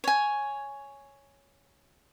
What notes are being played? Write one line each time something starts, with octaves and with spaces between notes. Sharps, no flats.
C#5 G#5